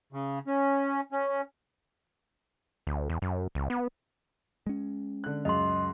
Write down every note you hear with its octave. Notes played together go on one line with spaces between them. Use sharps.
C#3
C#4
C#4
D2
E2
F#2
C#2
B3
G#3 C#4
D3 F#6
C#2 F#2 D#5 C6